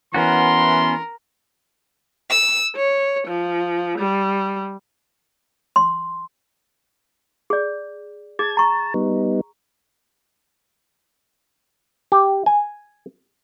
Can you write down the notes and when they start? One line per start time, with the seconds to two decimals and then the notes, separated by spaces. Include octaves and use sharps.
0.14 E3 B3 C#4 F#4 A#4 C6
2.29 E6
2.75 C#5
3.27 F3
3.99 G3
5.76 C6
7.50 G#4 D5
8.39 G#4 A5 G#6
8.57 A5 A#5 C#6
8.94 G3 B3 D#4
12.12 G4
12.46 G#5